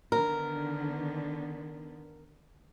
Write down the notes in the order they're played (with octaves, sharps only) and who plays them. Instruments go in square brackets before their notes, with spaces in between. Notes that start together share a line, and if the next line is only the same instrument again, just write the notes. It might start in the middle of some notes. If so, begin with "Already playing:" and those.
[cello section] D3 D#3 B3 [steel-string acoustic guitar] A#4